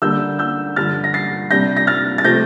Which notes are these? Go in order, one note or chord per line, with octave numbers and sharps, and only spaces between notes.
D3 G3 A#3 D4 E6 G6
E6 G6
G2 D3 F3 F6 A6
A#6
A6 C7
C3 G3 D4 G6 A#6
A#6
F6 A6
A6
C3 F3 A3 C4 G6 A#6